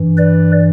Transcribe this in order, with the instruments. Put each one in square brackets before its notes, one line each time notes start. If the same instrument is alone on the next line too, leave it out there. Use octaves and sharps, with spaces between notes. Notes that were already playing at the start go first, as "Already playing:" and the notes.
Already playing: [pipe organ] G2 E3
B4 D5